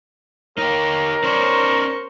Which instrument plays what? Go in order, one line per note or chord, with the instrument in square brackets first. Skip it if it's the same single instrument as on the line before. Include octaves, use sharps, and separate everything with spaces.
[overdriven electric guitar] D#4 G4 [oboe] A#4 [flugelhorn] C#5
[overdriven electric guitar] C#4 D5 [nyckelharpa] C5 C#6